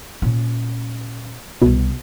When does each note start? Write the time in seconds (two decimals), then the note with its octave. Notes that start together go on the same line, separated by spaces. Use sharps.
0.22 A#2 C#4
1.62 C2 B2 G3